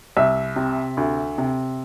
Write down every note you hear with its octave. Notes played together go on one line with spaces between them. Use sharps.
C2 E5
C3
D2
C3